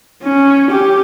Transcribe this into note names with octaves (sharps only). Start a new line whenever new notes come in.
C#4
G4